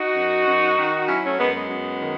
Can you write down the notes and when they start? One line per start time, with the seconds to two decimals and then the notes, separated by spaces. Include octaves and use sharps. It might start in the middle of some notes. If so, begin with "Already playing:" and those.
Already playing: D#4 F#4
0.16 F#2
0.46 F#2
0.77 D#3
1.08 F#3 C#4 E4
1.23 A3 C#4
1.39 F#2 G#3 B3
1.54 G#3 B3
1.69 F#2
2.00 D#3